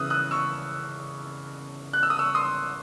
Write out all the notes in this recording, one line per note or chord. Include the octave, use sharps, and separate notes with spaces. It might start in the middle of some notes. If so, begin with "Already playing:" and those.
Already playing: C#3 E3 D#6 E6 F#6
D#6 F#6
C#6 E6
F#6
E6
D#6
C#6 E6
C6 D#6